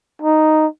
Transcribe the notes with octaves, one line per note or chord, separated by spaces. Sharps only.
D#4